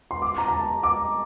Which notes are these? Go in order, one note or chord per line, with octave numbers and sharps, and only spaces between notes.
C6
D6
A#5
A#5
A5
D6